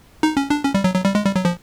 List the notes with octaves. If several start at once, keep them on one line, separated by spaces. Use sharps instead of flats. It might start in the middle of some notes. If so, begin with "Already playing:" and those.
D#4
C#4
D4
C#4
G3
F#3
F#3
G3
G#3
G3
F#3
F3